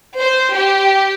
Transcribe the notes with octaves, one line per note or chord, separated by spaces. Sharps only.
C5
G4